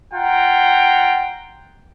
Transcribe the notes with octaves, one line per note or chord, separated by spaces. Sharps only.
F4 F#5 G5 A#5